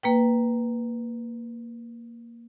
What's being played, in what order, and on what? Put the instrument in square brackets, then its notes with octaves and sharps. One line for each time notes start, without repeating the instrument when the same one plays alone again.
[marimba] A#3 B4 G5